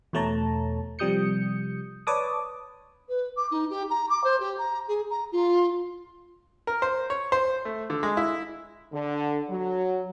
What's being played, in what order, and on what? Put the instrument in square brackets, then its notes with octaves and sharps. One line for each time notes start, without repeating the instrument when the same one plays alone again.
[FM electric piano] E2 B2 A3 C#5 A5 A#5
C3 F3 G3 D#6 G6 C#7
B4 C#5 D5 A5 D6 D#6
[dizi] B4
D6
D#4
G4
A#5
D6
C5
G4
A#5
G#4
A#5
F4
[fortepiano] A#4
C5
C#5
C5
A3
D3
G#3
E4
[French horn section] D3
F#3